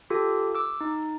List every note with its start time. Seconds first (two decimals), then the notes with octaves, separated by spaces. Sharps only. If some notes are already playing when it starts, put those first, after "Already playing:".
0.10 F4 G4 A4
0.55 D6 E6
0.81 D#4